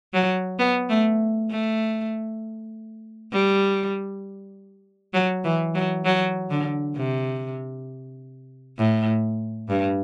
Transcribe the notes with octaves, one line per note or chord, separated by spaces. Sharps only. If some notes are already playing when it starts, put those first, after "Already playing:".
F#3
B3
A3
A3
G3
F#3
E3
F#3
F#3
D3
C3
A2
G2